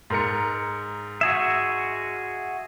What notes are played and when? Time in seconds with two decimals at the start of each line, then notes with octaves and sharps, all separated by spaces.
0.10 G#2 A#4 C#7
1.21 F#4 G#4 E5